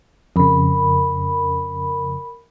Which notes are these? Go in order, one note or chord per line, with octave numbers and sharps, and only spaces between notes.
F2 C#3 A#4 B5